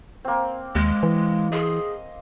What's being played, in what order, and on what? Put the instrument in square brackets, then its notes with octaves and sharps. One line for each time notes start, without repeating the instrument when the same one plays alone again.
[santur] A#3 C4
[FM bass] D#2 [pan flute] G#3
[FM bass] E3
[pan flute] G#4 [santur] D#5 C6